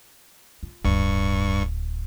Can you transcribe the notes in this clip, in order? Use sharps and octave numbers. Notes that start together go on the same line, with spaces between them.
F4
D1 D2 G2 C#6